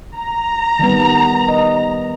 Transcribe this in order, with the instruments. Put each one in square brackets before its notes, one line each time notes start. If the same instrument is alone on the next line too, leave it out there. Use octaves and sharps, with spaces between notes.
[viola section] A#5
[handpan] D#3 G3 B3
D#5